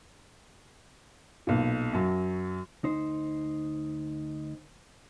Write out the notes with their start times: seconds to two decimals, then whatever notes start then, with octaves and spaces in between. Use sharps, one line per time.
1.47 B1 A#2
1.93 F#2 F#3
2.83 D2 D#4 C5